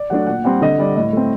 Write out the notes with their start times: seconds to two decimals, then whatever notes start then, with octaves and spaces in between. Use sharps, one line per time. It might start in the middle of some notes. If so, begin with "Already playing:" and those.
Already playing: D5
0.10 F#3 A3 D4 F#5
0.27 A#2 F#5
0.44 G3 C4 F#5
0.61 D3 D#5
0.78 G3 D4 D5
0.96 A2 D#5
1.13 A3 C4